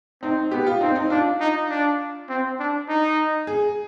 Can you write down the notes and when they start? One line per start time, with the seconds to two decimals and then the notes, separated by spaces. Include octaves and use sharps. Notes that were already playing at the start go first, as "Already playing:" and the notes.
0.22 C4 D#4
0.51 B3 G4
0.67 F4
0.81 C4 D#4
0.95 D#4
1.10 D4 F4
1.41 D#4
1.70 D4
2.29 C4
2.59 D4
2.89 D#4
3.47 G#4